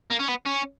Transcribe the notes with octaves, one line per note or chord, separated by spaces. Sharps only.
A#3
C#4
B3
C#4